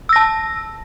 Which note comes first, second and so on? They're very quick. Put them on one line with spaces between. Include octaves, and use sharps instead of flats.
E6 A#6 A5